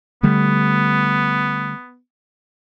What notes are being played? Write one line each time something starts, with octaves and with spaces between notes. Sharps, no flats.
D3 G3 A3 B3